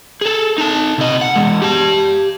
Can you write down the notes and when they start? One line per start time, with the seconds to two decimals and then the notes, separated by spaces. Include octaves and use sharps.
0.21 G#4 A4
0.58 D#4 A5
0.98 C3 D#5
1.21 F#5
1.36 E2 G#3
1.62 G4 A5